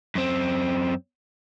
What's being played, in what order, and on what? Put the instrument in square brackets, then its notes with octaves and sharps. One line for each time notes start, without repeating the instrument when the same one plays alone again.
[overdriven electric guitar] F#2 C4